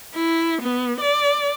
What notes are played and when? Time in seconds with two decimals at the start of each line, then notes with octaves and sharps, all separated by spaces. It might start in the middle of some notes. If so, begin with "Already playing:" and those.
0.15 E4
0.62 B3
1.01 D5